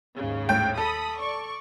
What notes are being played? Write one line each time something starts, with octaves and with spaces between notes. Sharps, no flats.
D#2 G#2 C#3
A2 G5
A4 B5 D#6
D5 C#6